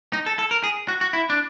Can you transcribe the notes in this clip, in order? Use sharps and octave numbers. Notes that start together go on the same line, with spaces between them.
D#4
A4
A4
A#4
G#4
F#4
F#4
E4
D4